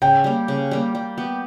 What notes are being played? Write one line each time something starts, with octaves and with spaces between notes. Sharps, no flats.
C#3 G5
G3 A#3
C#3
G3 A#3
G3
B3 G4